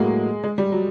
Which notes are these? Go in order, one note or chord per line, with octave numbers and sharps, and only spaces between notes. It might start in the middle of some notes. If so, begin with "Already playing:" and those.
Already playing: A2 F#3 G#3 A#3
G#3
G3
F#3